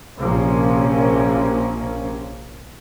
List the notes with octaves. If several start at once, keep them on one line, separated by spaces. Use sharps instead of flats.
A#1 C3 F3 A#3 C#4